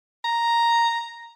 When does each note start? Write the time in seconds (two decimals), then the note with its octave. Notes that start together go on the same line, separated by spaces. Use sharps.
0.25 A#5